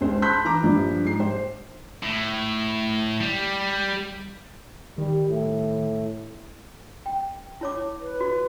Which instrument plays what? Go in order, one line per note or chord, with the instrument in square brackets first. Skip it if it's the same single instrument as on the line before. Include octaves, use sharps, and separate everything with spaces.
[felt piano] C#2 C5
A5 B5 C6 F#6 G6 B6
E3 A#5 D6
A#1 G2 F3
G#2 C7
C5
[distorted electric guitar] A2
G3
[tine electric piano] D#3 [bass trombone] G3
[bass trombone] A2
[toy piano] G5
E4 C#5 D6
[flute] B4
[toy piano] F#4